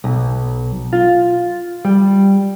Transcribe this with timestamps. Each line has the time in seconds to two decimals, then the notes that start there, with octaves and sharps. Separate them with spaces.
0.04 B1
0.93 F4
1.85 G3